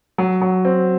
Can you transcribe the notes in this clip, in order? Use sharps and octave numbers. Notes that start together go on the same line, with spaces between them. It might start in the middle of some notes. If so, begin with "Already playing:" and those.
F#3
F#3
C4